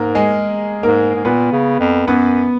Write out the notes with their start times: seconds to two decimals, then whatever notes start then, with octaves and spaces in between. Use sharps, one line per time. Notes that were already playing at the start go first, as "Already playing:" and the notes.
Already playing: G#2 A#3 A#4
0.15 G#3 G#4
0.83 G#2 A#3 A#4
1.16 G#2
1.25 A#2 B3 B4
1.52 C#3
1.80 F2
2.07 F#2 B3 B4